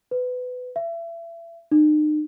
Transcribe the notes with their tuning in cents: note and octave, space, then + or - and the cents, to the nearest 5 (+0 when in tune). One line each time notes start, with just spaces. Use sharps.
B4 +20
E5 +30
D#4 -40